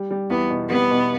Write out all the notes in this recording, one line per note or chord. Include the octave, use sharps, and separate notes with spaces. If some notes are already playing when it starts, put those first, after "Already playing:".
Already playing: G3
G3
E2 B3
B2
G3 B3
B2